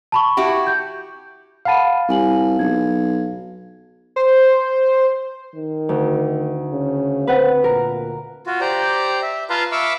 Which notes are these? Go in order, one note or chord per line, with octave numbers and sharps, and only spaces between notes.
A5 B5 C#6
E4 F#4 G4
G6
F5 F#5 A5 B5 D#7
C2 G4 G#5 F#7
B1 G#6
C5
D#3
D2
C#3
C4 B4 F#5
A#2 A#4
F4 F#4
G4 C5 D5 A#5
E5
F4 B4 F5 A5 A#5 C6
E5 F5 B5 C#6 D6 E6